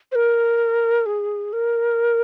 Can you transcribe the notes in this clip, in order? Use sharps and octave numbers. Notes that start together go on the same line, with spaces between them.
C5
A#4
G#4
A#4